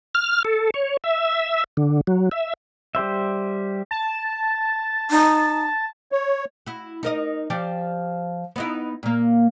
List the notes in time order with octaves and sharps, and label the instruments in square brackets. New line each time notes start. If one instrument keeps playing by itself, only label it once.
[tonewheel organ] F6
A4
C#5
E5
D3
F#3
E5
[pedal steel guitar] G3 G4 C5 E5
[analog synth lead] A5
[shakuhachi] D#4
[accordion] C#5
[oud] E4 F#4
D#4 A#4 D#5
F3 G4 D5
B3 D#4 E4
A#2 A#3